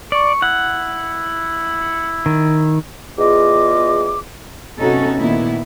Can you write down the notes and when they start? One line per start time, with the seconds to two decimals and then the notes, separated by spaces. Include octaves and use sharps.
0.12 D5 C#6
0.42 E4 F#5
2.26 D#3
3.18 E2 F4 G#4 D#5 D6
4.78 C3 B3 C#4 D#4 F#4 A4
5.19 A#2 D#3 B3 E4